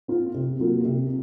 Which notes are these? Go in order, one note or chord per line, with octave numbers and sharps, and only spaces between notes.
C4 F4
C3
F#3 A#3 F4
C3